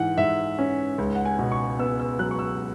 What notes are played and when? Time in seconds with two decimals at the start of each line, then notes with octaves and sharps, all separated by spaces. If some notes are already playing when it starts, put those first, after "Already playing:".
Already playing: G#2 E3 F#5
0.18 G#2 E5
0.59 C#4
0.98 C#2
1.15 F#5
1.25 G#5
1.39 B2
1.52 C#6
1.79 B3 E6
1.99 E6
2.19 F#3 F#6
2.31 C#6
2.39 E6